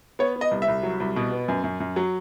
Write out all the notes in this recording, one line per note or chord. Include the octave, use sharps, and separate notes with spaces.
B3 C#5
B3
D#5
C2
E5
C2
F#3
C2
B2
B3
F#2
F#2
F#2
F#3